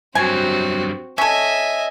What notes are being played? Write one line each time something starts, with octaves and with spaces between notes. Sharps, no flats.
G2 F#3 C4 F#4 G#5
C#4 A4 D#5 E5 G#5